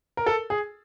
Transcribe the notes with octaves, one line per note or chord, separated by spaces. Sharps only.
A#4
A4
G#4